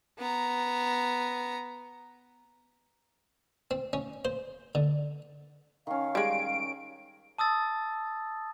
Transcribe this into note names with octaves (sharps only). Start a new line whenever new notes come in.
B3 A#5
C4
C#4
C5
D3
D#3 C#4 F5
G3 G#3 D7
A5 D#6 E6 A6